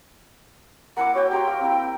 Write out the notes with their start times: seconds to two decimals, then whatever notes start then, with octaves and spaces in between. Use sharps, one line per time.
0.97 A#3 E4 F#5 D6
1.15 F#4 C#5 G5
1.31 G4 G5 A#5 C6
1.47 F5
1.59 C4 E4